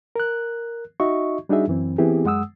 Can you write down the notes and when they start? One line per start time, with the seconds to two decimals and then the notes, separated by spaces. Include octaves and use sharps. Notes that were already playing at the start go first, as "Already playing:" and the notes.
0.16 A#4 F#6
1.00 D#4 F#4 D#5 E5 C#6
1.49 G3 D4 D#4 F#4 G#4 E5
1.68 F#2 E3 C4
1.98 E3 B3 C4 E4 G4 G#4
2.24 F#2 G#3 F#5 D#6 E6